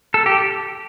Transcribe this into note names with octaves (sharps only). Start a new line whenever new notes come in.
A4
G4